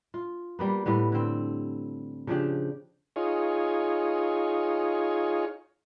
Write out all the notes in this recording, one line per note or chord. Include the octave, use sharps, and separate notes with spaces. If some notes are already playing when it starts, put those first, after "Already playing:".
F4
G3 A#3 B3
A2 G3 B3
D3 C4
C#3 F3 D4 G4
D#4 F4 G#4 C#5